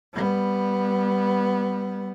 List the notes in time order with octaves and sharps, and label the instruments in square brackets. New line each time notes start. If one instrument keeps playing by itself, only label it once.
[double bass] G3 B3